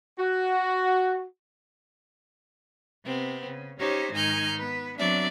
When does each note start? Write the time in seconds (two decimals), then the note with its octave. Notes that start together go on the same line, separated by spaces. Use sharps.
0.19 F#4
3.04 C3 B3 C4
3.45 C#3
3.78 C#4 D#4 G4 C5 C#5
4.11 G#2 D#3 D#4 G#5 F6 G6
4.57 B3 B4
4.98 F#3 B3 C4 D4 D5 E5